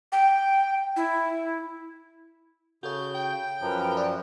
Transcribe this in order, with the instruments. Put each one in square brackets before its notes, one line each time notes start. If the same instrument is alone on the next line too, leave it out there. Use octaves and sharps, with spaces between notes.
[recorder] G5
E4
[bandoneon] C#3 G6 [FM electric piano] F#4 A4 C#5
[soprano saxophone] G5
[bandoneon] F#2 F3 [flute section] A#4 B4 A#5
[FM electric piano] D5